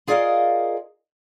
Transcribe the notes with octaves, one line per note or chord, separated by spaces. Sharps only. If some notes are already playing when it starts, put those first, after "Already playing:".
F4 G#4 A#4 D5 D#5 F5